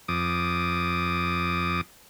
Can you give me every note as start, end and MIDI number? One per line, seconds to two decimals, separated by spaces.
0.08 1.81 41
0.08 1.81 86
0.08 1.81 87